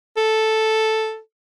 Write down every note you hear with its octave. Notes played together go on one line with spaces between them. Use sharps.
A4